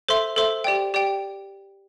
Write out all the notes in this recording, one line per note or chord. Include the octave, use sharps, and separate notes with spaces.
A4 C5 E5 C6
A4 C5 E5 C6
G4 D5 G5
G4 D5 G5